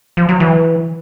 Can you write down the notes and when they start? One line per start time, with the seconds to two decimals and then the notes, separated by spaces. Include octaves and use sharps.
0.17 F3
0.29 F#3
0.40 E3